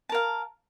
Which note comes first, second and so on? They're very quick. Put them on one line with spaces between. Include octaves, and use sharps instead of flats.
A5 A#4 F5